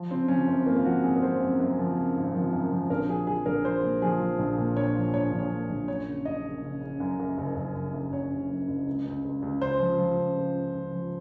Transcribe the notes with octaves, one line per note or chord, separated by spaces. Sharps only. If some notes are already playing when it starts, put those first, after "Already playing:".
Already playing: F3
C#3 C4
F3 C#4
F#2 C4
G#1 A#3
F4
F3 F#4
G#1 G#4
A#4
F3 C5
F#2
F#2
F3
C#3
G#1
F3
F#2
F3
A#1 A#4
F3 G#4
F3 G#4
A#1 A#4
F3 C5
A#2
F3 G#4
F3
A#1
A#2
A#1 C#5
F3
A#1 C#5
A#1
C#5
A#2
A#1
F#2 C#5
C#3
F#1 D#5
C#3
C#3
C#3
F#2
F#2
F#1
F#1
F#1
F#2
F#1 C#5
F#1
F#2
F#1
C#2
C#2
C#2
C#2
C#3 C5
F3
F3
C#2
C#2
C#3
C#3
F3